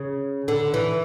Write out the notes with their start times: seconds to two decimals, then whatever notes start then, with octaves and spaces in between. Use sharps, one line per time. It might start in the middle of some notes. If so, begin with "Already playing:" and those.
Already playing: C#3
0.48 D3
0.74 E3